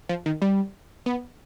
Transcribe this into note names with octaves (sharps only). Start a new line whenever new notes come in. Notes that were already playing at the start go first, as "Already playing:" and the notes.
F3
D#3
G3
B3